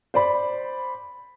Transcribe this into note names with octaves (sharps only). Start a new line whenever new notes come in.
C5 D5 B5